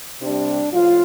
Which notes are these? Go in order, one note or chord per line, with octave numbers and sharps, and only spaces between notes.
C3 G3 D4
A2 F3 F4